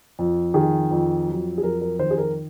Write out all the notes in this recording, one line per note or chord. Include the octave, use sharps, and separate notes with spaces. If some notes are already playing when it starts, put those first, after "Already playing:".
F2
D#3 G#4
F2
F#3
G#4
F2 A#4
A#4
D#3 C5
G#4
A#4